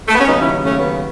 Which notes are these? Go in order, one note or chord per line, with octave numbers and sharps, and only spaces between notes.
A3
B3
C#4
D#2 C#3 F#3 B3 D#4
C#4 E4
A3 C#4
B3